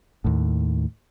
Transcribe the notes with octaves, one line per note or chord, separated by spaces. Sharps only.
D#2 A2